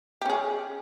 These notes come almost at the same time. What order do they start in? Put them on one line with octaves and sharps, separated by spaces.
G4 C#4 G#4